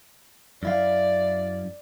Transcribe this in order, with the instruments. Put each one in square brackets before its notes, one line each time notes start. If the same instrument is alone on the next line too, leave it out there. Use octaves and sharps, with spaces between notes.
[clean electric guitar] F#2 E4 F5 [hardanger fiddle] D5